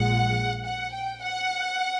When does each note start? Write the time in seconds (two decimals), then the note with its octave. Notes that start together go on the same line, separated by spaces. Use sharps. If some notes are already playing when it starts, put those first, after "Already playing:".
Already playing: A#1 A#2 F3 G#3 F#5
0.65 F#5
0.94 G5
1.23 F#5